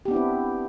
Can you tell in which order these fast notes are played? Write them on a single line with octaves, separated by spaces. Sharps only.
G4 B3 D4 E4 C4